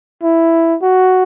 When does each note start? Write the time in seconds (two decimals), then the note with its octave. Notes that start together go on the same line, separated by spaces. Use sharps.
0.23 E4
0.82 F#4